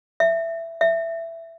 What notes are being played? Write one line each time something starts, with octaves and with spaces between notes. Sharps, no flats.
E5
E5